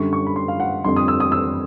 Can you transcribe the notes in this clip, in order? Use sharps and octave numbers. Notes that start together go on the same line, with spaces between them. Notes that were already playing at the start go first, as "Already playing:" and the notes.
Already playing: F#2 D3 G3 C#6
C#6
B5
C6
F5
F#5
F2 D3 G3 C6
D#6
E6
D#6
E6